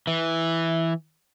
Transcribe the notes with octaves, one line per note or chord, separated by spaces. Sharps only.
E3